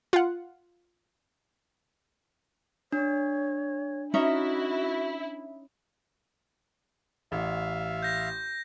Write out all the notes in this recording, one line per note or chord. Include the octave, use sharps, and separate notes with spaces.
F4 F#5
D4 C#5
C#4 D#4 E4 F#4 E5
A1 E5 F5
G6 A#6